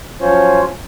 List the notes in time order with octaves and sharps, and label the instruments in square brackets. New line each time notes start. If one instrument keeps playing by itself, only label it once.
[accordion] F3 F#3 C#4 F4 C5 C#5